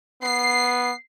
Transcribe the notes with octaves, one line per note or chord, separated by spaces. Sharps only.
B3 C7